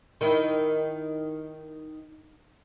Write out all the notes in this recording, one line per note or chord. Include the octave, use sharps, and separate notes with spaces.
D#3 E4